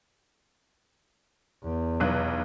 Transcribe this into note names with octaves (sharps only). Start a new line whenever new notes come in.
E2
F1 B1 F#6